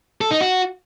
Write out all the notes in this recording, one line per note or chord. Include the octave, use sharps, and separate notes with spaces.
A4
D#4
F#4